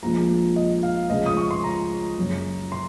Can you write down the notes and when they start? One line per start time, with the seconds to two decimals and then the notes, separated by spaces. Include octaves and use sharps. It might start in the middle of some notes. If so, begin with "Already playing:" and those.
0.03 A#1 A#2 F3 G#3 A#5
0.56 D#5
0.83 F5
1.10 C#2 C#3 F3 G#3 D#5
1.26 D#6
1.37 C#6
1.51 C6
1.64 A#5
2.18 F#1 F#2 C#3
2.72 C6